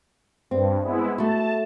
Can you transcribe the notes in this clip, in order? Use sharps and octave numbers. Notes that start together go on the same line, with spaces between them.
G2 C4
G#3 B3 E4
A3 F#4 A5